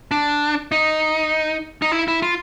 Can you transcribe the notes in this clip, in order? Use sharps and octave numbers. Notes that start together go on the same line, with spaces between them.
D4
D#4
D#4
E4
E4
F4